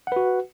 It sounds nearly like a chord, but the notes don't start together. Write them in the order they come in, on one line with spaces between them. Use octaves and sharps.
F#5 B4 F#4